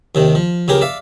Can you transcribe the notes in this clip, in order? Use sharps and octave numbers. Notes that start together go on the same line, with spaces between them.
D#2 C3 D#3
F3
C#2 C#3 G4 G#4 A#4
D5 E5 F5